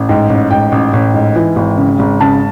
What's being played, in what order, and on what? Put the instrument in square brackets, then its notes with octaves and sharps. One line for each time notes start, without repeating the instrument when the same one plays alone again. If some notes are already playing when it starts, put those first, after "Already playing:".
Already playing: [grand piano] A1
G#2 G5
A1
G#2 G5
A1
A1
G#2
E3
G#1
C#3
G#1
C#3 A5